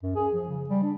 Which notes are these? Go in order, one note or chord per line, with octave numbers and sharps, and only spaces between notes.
F#2
G#4
F3
C#3
G3
D4